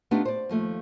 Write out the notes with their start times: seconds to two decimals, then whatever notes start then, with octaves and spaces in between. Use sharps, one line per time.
0.11 A3 B3 D4 D#4 F4 G4
0.25 C5 D5
0.49 D#2 F3 A3